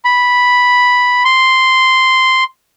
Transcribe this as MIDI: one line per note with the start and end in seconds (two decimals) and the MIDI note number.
0.05 1.23 83
1.25 2.44 84